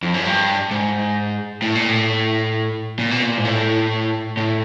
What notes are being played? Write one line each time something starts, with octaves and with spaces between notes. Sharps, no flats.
F2
F#2
G2
G#2
A2
A#2
A2
A#2
B2
A#2
G#2
A2
A2